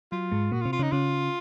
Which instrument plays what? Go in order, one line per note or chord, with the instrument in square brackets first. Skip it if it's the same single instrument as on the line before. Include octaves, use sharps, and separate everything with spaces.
[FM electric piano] F#3 [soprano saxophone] F4
[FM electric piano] G#2 G#3
[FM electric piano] A#2 A#3 [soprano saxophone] F#4
[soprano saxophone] F4
[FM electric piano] C3 C4
[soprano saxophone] F4
[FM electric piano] C#3 C#4 [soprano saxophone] D#4
[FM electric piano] C#3 C#4 [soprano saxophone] F4